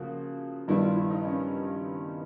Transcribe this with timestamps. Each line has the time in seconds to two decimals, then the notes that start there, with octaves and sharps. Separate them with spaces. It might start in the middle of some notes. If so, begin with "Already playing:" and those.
Already playing: C#3 F3 A#3 F#4
0.68 G2 D#3 G3 B3 E4
0.82 F4
0.96 E4
1.10 D#4
1.25 C#4